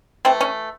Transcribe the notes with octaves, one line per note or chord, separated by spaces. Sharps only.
E3 A3 C4
C#4